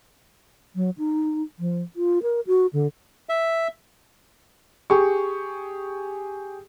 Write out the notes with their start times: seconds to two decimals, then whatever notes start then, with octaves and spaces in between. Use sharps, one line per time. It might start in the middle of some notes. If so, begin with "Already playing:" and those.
0.76 F#3
0.98 D#4
1.59 F3
1.96 F4
2.23 A#4
2.47 F#4
2.73 D3
3.29 E5
4.90 G4 G#4 C#6